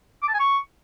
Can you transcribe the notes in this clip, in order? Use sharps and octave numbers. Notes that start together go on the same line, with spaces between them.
D6
A5
G#5
C#6